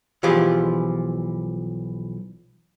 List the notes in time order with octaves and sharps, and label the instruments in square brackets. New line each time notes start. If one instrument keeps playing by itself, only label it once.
[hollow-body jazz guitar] B1 E3 F3 F4 G4 G#4